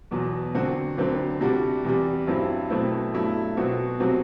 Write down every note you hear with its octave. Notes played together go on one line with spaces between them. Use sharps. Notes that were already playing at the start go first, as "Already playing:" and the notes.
E2 B2 F#3
D3 F#3 C4 F#4
D2 D3 F#3 C4
C3 G3 D4 F#4
E2 C3 G3
G2 F#3 C4 E4
B2 F#3 A3 C4 E4
G2 F#3 A3 E4
B2 F#3 C4 F#4
C3 F#3 C4 F#4